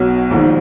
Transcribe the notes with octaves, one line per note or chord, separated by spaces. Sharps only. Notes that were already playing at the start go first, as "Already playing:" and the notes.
Already playing: B1 B2 C#5
A#1 G#2 D#3